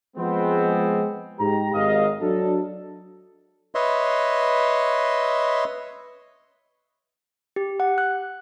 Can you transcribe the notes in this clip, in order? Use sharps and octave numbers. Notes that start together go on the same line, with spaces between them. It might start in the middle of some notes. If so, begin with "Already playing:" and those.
F3 G#3 B3 C4
G#2 G4 A#5
G#1 G#2 D#5 F5
F#3 D4 A4
B4 C#5 D#5 E5 C6
G4
F#5
F#6